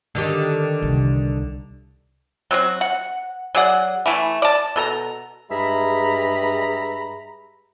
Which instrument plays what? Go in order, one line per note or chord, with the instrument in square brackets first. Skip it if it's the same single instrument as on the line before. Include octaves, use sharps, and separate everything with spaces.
[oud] D3 D#3 G4
[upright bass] C2
[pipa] F#3 C4 F#4
F#5
F#3 G#4 D5 F#5
E3 A3 E4
D5 A5
B2 A4 A#5
[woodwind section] G2 G#3 G#4 E5 A#5 B5